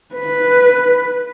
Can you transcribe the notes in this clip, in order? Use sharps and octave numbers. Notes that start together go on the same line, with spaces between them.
B4